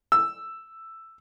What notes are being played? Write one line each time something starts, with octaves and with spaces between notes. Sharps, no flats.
E6